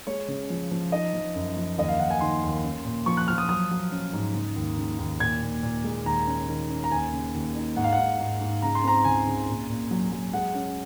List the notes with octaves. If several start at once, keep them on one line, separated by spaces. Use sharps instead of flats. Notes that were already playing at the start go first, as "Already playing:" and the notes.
G#3 C#5
C#3
F3
F3
D#4 D#5
F3
F#2
F3
D#2 D#5
F5
D#2 F#5
G#5
D#3 C6
D#2
C#4
A#2
F3 C#6
F#6
F3 F6
D#6
F#3 D#6
F#3
C#4
G#2
C#3
D#2
C#3
D#2
A#2 G#6
A#2
A#2
G#3
D#2 A#5
C#4
D#3
C#4
A#5
D#2 G#5
C#3
D#2
D#4
G#2 F#5
F5
F#5
G#2
G#2
G#2
C#3 A#5
C6
C4 A#5
C#2 G#5
C#3
A#2
A#2
F#3
F#3
G#3 F#5
C#4